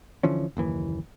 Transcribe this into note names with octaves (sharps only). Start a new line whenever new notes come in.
D3 E3 F3 C#4
F#1 D#2 E3